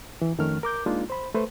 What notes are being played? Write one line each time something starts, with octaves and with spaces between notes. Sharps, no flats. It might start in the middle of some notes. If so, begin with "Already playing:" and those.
E3
F2 D#3 A3 C#4 A#4 F6
A#4 D6 G6
G#3 A#3 D4 D#4 F4
C5 B5
A3 A4 B4 C5